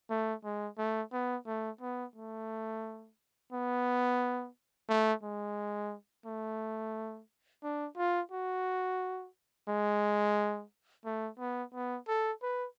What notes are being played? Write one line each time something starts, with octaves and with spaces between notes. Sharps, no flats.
A3
G#3
A3
B3
A3
B3
A3
B3
A3
G#3
A3
D4
F4
F#4
G#3
A3
B3
B3
A4
B4